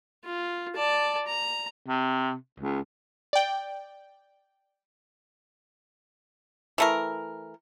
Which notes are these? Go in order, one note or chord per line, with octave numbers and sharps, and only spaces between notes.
F4
D5 A5
A#5
C3
C#2
D5 G5
E3 A3 A#4